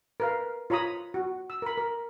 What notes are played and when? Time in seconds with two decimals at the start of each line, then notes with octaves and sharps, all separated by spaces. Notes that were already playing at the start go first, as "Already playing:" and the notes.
0.20 A#4 B4 F5
0.70 F4 C#5 A#5 B5 D#6
1.14 F#4
1.50 E6
1.62 A#4 B5
1.78 A#4